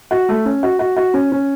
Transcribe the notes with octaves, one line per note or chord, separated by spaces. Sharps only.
F#4
A3
C#4
F#4
F#4
F#4
C#4
C#4